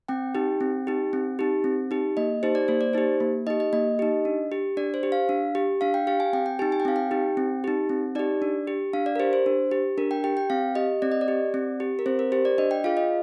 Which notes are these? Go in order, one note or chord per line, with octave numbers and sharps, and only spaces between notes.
C4 G5
D#4 G4
C4
D#4 G4
C4
D#4 G4
C4
D#4 G4
A#3 D#5
D#4 G4 C5
D5
A#3 C5
D5
D#4 G4 C5
A#3
D#4 G4 D#5
D#5
A#3 D#5
D#4 G4
D4
G4
D4 D5
C5
G4
F5
D4
G4
D4 F5
G5
G4 F5
G#5
C4 G5
G5
D#4 G4 G#5
G#5
G5
C4 F5
G5
D#4 G4
C4
D#4 G4
C4
D#4 G4 D5
D4
G4
D4 F5
D5
A#4
G4 C5
C5
D4
G4
D4 A#4
G5
G4 G5
G5
C4 F5
G4 D#5
C4 D5
D#5
D5
G4
C4
G4
A#4
C4 C5
A#4
G4 C5
D5
D4 D#5
G5
F4 G#4 F5
D#5